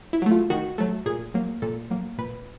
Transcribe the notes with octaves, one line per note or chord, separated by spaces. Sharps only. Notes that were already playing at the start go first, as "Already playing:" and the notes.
E4
F#3 A3
F4
D#3 F#4
F#3 A3
A#2 G#4
F#3 A#3
A#2 A4
F#3 A#3
A#2 B4